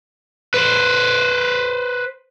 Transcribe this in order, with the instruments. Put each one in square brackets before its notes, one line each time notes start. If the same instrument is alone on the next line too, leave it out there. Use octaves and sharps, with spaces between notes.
[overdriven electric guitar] B4 C5